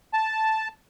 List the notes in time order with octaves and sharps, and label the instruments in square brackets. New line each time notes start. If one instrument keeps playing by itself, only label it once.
[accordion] A5